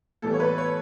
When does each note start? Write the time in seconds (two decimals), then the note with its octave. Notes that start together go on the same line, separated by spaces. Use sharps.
0.22 A2 E3 G3 B3 A4
0.34 C#5
0.40 B4
0.58 C#5